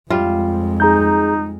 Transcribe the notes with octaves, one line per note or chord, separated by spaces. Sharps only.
F2 G3 G#3 F4
D#4 G#4 A#5 G6